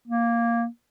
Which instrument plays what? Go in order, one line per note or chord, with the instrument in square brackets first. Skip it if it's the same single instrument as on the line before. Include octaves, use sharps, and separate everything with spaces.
[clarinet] A#3